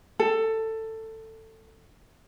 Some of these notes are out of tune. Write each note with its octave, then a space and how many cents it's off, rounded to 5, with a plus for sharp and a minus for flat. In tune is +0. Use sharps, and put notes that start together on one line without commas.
A4 +15